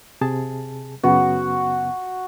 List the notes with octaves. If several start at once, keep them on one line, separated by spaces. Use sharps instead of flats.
C3 G#4 A5
F#2 C#3 B3 F#4